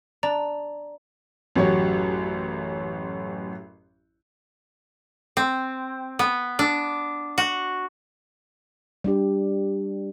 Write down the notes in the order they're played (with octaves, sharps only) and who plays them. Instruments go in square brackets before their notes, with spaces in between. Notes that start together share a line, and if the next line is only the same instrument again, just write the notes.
[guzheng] D4 [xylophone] D5 A#5
[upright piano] A1 F#2 F#4 G4 C#5
[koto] C4
B3
D4
F#4
[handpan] G3 D4 G4